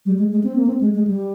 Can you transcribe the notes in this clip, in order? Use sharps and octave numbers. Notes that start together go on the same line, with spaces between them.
G3
G#3
G#3
C4
A#3
C4
G#3
G#3
G3